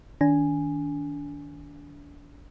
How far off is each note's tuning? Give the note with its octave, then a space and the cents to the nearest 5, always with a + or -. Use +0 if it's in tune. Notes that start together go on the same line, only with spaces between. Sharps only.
D#3 +5 D4 -35 G#5 +0